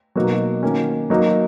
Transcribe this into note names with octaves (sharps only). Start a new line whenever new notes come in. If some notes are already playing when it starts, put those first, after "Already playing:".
B2 F#3 A#3 D#4 F#4
D#3 A#3 C#4 F#4
F#3 A#3 D#4 F#4